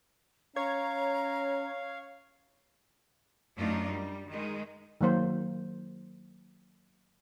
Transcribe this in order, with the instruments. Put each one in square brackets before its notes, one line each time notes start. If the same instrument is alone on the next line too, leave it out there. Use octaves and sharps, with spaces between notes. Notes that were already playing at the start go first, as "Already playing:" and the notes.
[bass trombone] C#4 [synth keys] C#5 G#6 [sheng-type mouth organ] F5 [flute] A#5
[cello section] F#2 A3 D4 D#4 F4
G3
D#3 G#3
[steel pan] D#3 F#3 A#3 C5